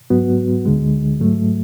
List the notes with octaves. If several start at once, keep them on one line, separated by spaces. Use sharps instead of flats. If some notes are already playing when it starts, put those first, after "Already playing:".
G#2 F#3 B3 F#4
D2 D3 G#3
G#2 F#3 A3